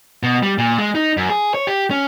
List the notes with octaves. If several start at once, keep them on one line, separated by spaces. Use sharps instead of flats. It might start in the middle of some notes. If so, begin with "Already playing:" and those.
B2
G3
A#2
G#3
D#4
F#2
G#4
C#5
G4
C#4